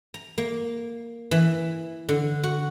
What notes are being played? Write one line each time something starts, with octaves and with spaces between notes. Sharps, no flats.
A#5
A#3
E3
D3
F#4